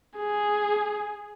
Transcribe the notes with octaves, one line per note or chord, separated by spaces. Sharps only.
G#4